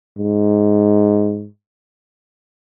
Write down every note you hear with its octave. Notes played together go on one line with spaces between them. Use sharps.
G#2